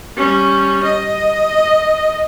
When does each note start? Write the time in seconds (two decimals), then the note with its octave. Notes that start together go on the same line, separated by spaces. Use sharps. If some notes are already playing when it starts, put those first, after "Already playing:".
0.17 G3 C#4
0.83 D#5